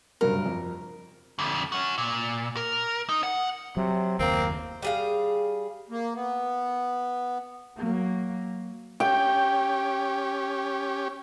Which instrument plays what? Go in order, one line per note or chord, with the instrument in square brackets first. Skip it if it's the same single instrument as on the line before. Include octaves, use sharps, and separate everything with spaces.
[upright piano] F#1 G2 F#3 [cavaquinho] A#4
[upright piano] F2
[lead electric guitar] F2 D3
C#4 F#4
A#2
A#4
D#4
F#5
[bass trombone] C3 [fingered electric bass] F#3
[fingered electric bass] F#1 D#2 [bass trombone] A#3 [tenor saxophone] C4
[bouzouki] G3 G#4 F5
[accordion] A#3
B3
[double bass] F#3 A#3
[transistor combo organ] C#4 G4 [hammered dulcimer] G5